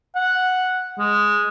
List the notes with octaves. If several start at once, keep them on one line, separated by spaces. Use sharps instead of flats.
F#5
G#3